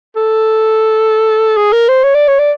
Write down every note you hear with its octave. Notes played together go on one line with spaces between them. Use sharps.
A4
G#4
A#4
C5
C#5
D5
C#5
D5